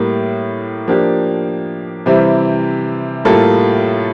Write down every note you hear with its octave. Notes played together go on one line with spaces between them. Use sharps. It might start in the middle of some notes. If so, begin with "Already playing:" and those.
Already playing: A2 G3 A#3
F3 A#3 D4 G4
C3 E3 G3 C4 E4
A2 G3 A#3 F4 A4